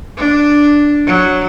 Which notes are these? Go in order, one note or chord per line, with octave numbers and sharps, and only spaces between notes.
D4
F#3